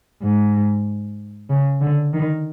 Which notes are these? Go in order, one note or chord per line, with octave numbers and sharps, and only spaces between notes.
G#2
C#3
D3
D#3